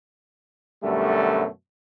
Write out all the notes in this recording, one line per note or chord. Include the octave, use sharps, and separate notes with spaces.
F#2 B2 D3 G3 A3